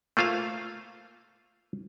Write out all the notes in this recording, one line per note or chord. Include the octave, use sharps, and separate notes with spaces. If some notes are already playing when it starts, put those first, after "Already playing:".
A3 A#3 F4 C5 F5